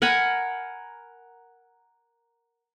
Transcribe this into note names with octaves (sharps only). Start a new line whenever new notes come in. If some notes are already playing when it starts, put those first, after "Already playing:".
A#4 F#5 G#5 B5